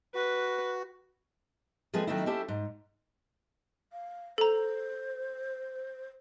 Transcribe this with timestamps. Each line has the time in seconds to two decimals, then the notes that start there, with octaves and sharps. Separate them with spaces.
0.15 F#4 B4
1.93 F3 G#3 A3 C4 G#4 B4
2.07 D#3 F#3 A3 C4 D#4 E4
2.26 C#4 E4 G4 A4 C5 E5
2.48 G#2
3.93 F5
4.38 A4 C5 A#5